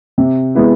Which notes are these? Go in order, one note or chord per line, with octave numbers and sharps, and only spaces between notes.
C3
G#3 B3 E4